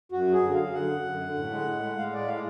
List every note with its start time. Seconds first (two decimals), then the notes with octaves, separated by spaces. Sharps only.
0.12 F#2 F#4
0.28 F#3
0.33 G#4
0.43 D3
0.53 F5
0.58 F#3
0.74 D3 F#5
0.89 F#2
1.05 F#2
1.20 D3
1.36 A2
1.51 G#3
1.67 A2
1.82 G#3
1.97 G#3 F5
2.13 A2 D5
2.28 G#3 F5